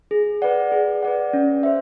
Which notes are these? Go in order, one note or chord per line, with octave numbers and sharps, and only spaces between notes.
G#4
B4 D5 F#5
G#4
B4 D5 F#5
C#4
C5 E5